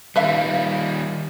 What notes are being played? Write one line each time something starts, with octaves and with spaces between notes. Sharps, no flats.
D#3 G3 B4 E5 F5